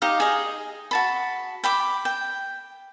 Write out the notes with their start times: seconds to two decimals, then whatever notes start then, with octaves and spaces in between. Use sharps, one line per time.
0.02 D#4 G4 D#5 F5
0.20 G#4 D#5
0.91 F#4 A5 B5
1.64 G5 B5 D6
2.05 G5